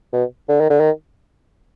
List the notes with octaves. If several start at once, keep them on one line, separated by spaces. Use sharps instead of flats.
B2
D3
D#3
D3
D#3